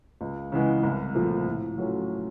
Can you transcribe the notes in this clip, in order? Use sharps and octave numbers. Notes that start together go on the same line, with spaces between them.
C#2
C#3 E3 G#3 B3
C2
A#2 F3 A3
A2
F#3 A3 C#4 F4